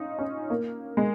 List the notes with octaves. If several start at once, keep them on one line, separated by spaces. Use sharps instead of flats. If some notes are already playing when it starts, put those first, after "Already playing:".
Already playing: C#4 D#4 F4
C#4
A#3
G#3